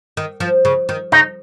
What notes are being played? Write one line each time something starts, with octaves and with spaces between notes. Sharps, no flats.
D#3
F3
C#3
D#3
C#3 D#4